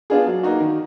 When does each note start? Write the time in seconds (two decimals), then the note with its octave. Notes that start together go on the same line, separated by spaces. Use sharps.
0.10 B3 D4 F4 G#4
0.27 F#3
0.43 A#3 D#4 F#4
0.60 D#3